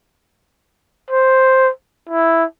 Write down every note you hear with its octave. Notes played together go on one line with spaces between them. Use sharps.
C5
E4